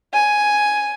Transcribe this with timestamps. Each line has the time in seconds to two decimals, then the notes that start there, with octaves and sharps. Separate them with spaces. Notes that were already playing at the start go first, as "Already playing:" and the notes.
0.13 G#5